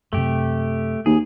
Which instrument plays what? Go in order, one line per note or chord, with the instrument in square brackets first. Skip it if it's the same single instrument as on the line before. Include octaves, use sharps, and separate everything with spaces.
[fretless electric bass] F#2 C3 [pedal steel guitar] A3 G4
[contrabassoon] D#2 [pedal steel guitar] G#4